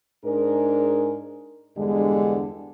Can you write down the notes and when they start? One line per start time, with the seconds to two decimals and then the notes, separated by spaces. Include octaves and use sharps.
0.24 G#2 D4 G#4 A#4
1.76 E2 G2 D3 G3 G#3